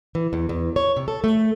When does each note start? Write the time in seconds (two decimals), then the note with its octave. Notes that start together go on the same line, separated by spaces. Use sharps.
0.15 E3
0.33 E2
0.49 E2
0.76 C#5
0.96 C3
1.08 A4
1.24 A3